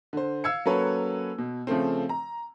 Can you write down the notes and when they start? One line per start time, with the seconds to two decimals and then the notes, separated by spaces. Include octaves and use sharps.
0.13 D3 C5
0.44 F5 E6 G#6 C#7
0.65 F#3 A#3 C#4 A4 B4 C#5
1.38 B2
1.67 C#3 F3 A3 C4
2.09 A#5